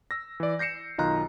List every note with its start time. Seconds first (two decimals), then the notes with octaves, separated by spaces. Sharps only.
0.11 E6 A#6
0.40 E3 D5
0.59 G6 A#6 C7 C#7 E7
0.98 B1 D#3 F4 D#5 A#5 F#6